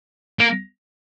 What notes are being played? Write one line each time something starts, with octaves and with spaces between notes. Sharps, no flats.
A#3